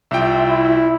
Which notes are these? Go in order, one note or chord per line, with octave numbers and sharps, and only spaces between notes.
C2 F4 E5 G5
E4